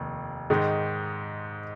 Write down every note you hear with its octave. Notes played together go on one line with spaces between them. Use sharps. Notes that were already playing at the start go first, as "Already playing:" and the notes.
Already playing: F1 D#2
G#2 D#3 G#3 D#4